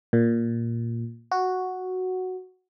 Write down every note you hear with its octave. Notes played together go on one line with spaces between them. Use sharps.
A#2
F#4